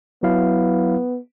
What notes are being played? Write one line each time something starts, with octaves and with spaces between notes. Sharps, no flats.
F#3 B3 E4 F5